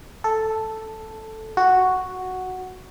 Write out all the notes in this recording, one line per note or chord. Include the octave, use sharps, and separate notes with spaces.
A4
F#4